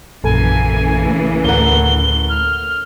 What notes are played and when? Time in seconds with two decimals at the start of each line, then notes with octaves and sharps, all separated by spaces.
0.24 A#1 F#2 C#3 E3 A#3 A4 G#5
1.44 D2 A2 A#4 F#5 G7
2.29 F6